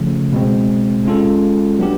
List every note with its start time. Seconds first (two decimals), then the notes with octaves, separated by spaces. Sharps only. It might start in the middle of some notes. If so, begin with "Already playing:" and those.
Already playing: C#3 F3 A3
0.33 B2 G#3 C4
1.05 G#3 C#4 F4 A4
1.79 F#3 B3 D4 G4